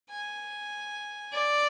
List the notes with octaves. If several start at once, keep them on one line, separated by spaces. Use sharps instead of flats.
G#5
D5